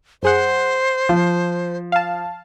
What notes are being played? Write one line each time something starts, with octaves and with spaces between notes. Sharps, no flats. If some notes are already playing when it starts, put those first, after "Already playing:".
F#2 G#4 C5 F#5
F3 F4
F5 A5